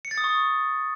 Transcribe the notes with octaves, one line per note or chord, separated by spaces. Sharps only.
C#7
A6
D#6
C#6